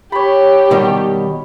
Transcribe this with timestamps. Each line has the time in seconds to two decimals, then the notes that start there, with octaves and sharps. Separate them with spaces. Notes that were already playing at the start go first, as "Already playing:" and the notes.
0.12 G4 C#5 B5
0.71 B2 D#3 G3